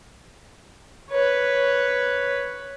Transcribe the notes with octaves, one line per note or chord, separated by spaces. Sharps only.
B4 C#5